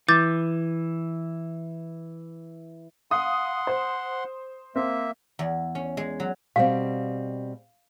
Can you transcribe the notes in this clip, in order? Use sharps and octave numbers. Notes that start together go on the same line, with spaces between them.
E3 D6 G6 A6
F5 F#5 C6 D#6
C5
A#3 C4 E5
E2
C#4
G#3
F#3
B2 G3 C4 F5